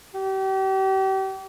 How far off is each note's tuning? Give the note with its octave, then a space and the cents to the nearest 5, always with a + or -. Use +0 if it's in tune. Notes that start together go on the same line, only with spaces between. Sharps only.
G4 -35